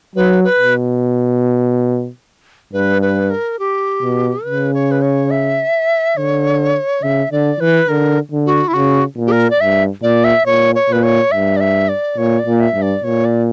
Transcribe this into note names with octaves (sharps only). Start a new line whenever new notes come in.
F#3 B4
B4
B2
G2 B4
B4
A#4
G4
B2
C#3 B4
C#5
B4
C#5
E5
D3 C#5
C#3 E5
D3 D5
E3 B4
D3 A#4
D3
F#4
E4
C#3 F#4
A#2
G4
A#4
D5
G2 E5
A#2 D5
E5
A#2 C#5
C#5
A#2 B4
C#5
G2 E5
D5
E5
D5
A#2 C#5
D5
A#2
E5
G2
D5
A#2 C#5
D5